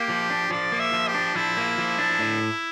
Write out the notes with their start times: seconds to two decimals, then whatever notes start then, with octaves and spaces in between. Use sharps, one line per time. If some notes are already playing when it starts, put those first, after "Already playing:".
Already playing: A#3 G4
0.09 F3
0.30 D4
0.51 F3 D5
0.72 A#3
0.79 E5
0.93 F3
1.08 G4
1.15 D4
1.35 F3 E4
1.57 A#3
1.78 F3
1.98 D4
2.19 A2